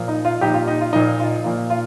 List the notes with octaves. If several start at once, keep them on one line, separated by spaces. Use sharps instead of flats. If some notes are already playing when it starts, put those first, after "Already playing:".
Already playing: A#2 F3 A#3
D#4
F4
A#2 F3 A#3 D#4 G4
F4
D#4
F4
A#2 F3 A#3 D#4
F4
A#2 F3 A#3
F4